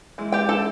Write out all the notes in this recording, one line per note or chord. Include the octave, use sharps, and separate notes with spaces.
E3 G#3
G4 G5
A4 A5